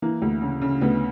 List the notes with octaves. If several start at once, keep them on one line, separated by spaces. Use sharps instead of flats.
E3 A#3
D2
C#3
C#3
D2 B3